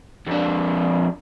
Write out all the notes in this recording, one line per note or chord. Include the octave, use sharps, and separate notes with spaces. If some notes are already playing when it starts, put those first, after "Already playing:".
F2 D4